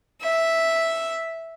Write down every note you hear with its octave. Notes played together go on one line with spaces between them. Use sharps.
E5